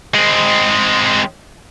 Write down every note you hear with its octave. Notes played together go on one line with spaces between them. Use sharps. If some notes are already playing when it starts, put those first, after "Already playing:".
G#3 C4